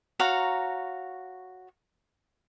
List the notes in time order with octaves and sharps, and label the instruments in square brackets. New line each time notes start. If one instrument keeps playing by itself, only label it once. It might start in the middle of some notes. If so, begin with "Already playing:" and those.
[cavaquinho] F#4 C#5 F5 A#5